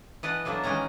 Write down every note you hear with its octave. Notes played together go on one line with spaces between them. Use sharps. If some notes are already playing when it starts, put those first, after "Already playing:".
E3 B4 D#5 F#5 A5
B2 F#3 A#3 D4 A4
D#3 E3 G#3 C#4 A#5